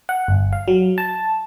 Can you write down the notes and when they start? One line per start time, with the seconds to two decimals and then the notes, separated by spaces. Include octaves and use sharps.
0.09 F#5
0.28 G1
0.53 F5
0.68 F#3
0.98 A5